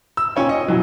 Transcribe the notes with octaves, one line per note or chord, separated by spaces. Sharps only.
E6
A#2 C#4 C#5 G5
D#5
B2 E3 F#3